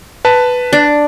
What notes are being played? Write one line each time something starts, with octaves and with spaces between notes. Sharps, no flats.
B4 A5
D4